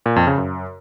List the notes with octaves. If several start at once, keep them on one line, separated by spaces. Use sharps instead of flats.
A#2
F2
C#3
F#2